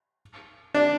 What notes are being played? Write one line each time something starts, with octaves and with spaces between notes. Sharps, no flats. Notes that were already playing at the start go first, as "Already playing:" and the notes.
D4